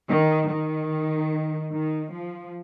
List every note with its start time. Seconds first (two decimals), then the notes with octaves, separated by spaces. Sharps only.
0.10 D#3
0.50 D#3
1.73 D#3
2.14 F3